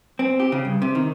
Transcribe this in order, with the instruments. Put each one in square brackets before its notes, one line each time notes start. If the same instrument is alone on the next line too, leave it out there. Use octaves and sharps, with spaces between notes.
[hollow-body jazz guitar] C4
G4
C#3
G2
C3
D#3